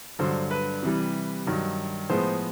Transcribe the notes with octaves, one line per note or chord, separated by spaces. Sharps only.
G2 D3 F#3 C5
B4
C3 E3 G3
G2 D#3 F#3
A2 F3 G#3 B3 C5